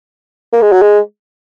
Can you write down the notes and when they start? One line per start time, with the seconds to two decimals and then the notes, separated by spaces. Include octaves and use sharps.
0.53 A#3
0.62 G#3
0.72 F#3
0.82 G#3